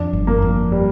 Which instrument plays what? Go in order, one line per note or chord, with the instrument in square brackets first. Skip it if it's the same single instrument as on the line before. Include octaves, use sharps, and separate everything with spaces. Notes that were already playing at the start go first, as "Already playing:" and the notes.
Already playing: [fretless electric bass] F2 [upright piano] D4
[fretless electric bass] G1
[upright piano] A#3
[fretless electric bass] F2
[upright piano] G3